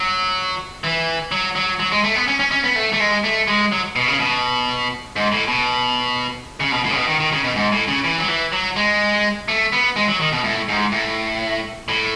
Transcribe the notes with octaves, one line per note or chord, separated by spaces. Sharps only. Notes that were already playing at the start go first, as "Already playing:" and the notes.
Already playing: F#3
E3
F#3
F#3
F#3
G#3
A3
B3
C#4
C#4
C#4
B3
A3
A3
G#3
A3
G#3
F#3
B2
C#3
B2
G#2
A2
B2
C#3
B2
A2
C#3
B2
D#3
D#3
C#3
B2
G#2
A2
C#3
E3
F#3
E3
F#3
G#3
A3
B3
G#3
F#3
D#3
B2
A2
G#2
A2
A2